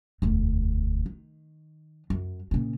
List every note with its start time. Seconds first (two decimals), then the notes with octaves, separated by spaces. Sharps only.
0.22 E1 D2
1.06 D#3
2.10 F#2
2.51 A#2 C#3